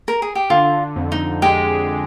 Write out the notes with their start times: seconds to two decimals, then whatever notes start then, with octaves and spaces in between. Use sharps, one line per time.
0.08 A#4
0.22 G#4
0.35 G4
0.50 D3 F4
0.96 F2
1.12 D#4
1.42 G#3 G4